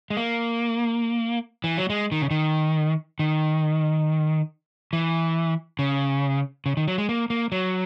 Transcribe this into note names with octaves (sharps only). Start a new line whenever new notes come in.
G#3
A#3
E3
F#3
G#3
D#3
C#3
D#3
D#3
E3
C#3
C#3
D#3
F#3
G#3
A#3
A#3
F#3